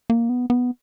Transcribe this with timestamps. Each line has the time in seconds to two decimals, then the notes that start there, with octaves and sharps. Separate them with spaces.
0.10 A#3
0.29 B3
0.50 B3